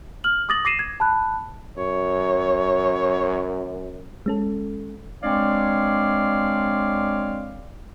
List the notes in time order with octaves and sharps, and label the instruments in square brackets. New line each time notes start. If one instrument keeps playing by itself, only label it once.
[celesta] F6 F#7
D6 D#6 A6 A#6 F#7
D6 A#6 C7 D#7 E7
G#6
A5 B5 F#6
[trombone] F#2 [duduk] C#5
[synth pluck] G#3 C#4 A4
[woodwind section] G#3 C4 D4 C#5 D5 F5